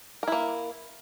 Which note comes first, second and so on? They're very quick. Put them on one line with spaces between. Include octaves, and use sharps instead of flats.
A#4 E4 A#3